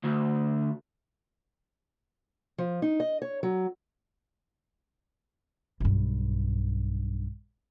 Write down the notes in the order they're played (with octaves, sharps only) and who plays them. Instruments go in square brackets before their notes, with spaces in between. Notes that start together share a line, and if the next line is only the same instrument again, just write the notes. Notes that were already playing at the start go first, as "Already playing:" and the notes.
[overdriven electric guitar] D2
[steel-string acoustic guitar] F3
D#4
D#5
C#5
F#3
[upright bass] B1 G2